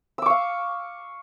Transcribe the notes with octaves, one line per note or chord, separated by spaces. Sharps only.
F5 C#6 D6 E6